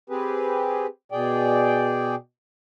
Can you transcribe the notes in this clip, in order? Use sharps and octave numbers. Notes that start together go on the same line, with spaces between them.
C4 G4 G#4 B4
B2 G#4 D5 G5